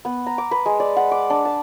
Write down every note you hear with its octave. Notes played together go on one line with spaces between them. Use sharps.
B3
A#5
D6
B4
G#3
D5
F#5
D6
D4
A5